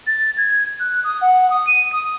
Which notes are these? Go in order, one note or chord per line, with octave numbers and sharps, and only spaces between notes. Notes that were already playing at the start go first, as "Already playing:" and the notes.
A6
G#6
F#6
D#6
F#5
D#6
D#7
D#6